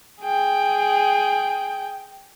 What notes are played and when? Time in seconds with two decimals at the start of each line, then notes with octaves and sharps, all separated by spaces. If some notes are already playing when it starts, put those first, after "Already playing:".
0.23 G#4 G5